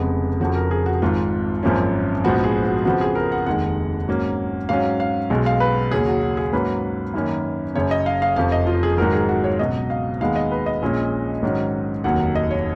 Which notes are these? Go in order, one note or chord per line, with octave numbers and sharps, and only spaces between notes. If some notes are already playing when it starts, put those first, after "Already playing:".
Already playing: F1 F2 C#3 G#3 B3
F1 F2 C#3 F3 F#4
A#4
G#4
F#4
G#1 G#2 D#3 F4
G#1 F#2 F3 A#3 C#4
A#1 G#2 F3 B3 F#4
G#4
F#4
F2 C#3 F3 B3 F#4
G#4
A#4
F#5
F1 D#2 D#3 G#3 F#5
G#2 F#3 A#3 C#4
G#2 F#3 C#4 F5
F5
B1 B2 G#3
F5
B4
D#2 C#3 F#3 C#4 G#4
F#4
F#4
G#4
G#2 F#3 A#3 C#4 B4
F#2 D#3 A#3 C#4
F#1 F#2 C#3 C#5
D#5
F5
F5
F1 F2 F3 F5
D#5
F4
G#4
G#2 D#3 F#3 A#4
G#4
F#4
C#5
C#2 B2 F#3 D#5
F5
D#2 D#3 G#3 B3 F5
D#5
B4
D#5
A#1 A#2 G#3 C#4
G#2 D#3 F#3 C#4
F1 D#2 D#3 F#3 F#5
D#5
C#5